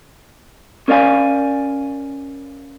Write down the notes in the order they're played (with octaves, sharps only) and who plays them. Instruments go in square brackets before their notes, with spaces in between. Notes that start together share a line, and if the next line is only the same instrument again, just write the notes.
[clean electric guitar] C#4 A#4 D5 F5 G#5